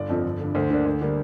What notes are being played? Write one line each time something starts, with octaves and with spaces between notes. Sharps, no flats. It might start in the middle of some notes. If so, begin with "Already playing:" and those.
Already playing: G1 D5
F2 F3 C4
G1
G2 D3
D2 C5
D3 A#3 D4
D2
D3 G3 A#3